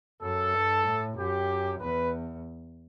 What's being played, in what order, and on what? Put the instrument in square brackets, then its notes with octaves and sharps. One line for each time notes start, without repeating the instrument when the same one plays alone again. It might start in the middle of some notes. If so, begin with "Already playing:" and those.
[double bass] F#2 [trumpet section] A4
[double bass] G2
A2
[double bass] F#2 [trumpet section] G4
[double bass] E2 [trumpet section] B4